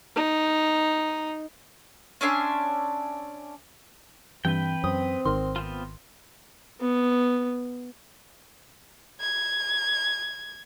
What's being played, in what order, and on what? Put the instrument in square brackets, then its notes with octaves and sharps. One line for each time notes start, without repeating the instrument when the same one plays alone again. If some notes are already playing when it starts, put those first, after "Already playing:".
[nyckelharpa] D#4
[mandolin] C#4 D4 E5 C6
[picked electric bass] G2 [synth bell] E3 C4 G7 [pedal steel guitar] B4 G5
[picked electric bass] F#2 [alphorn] C4 [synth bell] D#6
[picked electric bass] G#1 D#3 [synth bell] A#4 C6
[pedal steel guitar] B3 C4 F4
[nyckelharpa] B3
[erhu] G#6